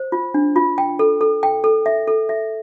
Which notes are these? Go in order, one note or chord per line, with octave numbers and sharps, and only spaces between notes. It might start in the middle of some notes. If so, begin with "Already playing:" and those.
Already playing: C5
F4
D4
F4
G5
A4
A4
G5
A4
E5
A4
E5